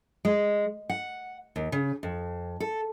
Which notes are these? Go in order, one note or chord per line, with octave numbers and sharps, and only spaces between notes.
G#3
F#5
D#2
C#3
F2
A4